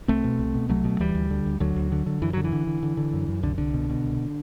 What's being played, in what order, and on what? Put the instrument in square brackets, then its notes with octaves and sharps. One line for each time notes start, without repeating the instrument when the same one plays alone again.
[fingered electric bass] C2 A3 C4
B2
C2
B2
C2 F#3 A3
B2
D2 E3 G3
D2
D3
D2
D2 D3 F#3
D2
D3
D3
F#2 E3
D3 F#3
E3
D3
D3
D3
D3
F#2
F#2
C2 D3
C2 D3
B2
B2
C2